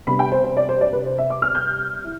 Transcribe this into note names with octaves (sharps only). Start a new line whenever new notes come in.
C3 G3 B3 D4 B5
G5
C5
C5
D5
C5
D5
B4
C5
E5
D6
F6
G6
E4